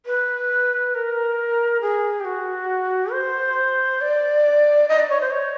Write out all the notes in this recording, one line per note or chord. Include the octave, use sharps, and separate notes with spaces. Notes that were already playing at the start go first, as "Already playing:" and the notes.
B4
A#4
G#4
G4
F#4
C5
D5
D#5
D5
C#5
C5
C#5